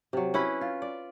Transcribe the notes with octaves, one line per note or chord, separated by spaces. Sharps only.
C3 F#3
C#4 E4 B4
F4
D5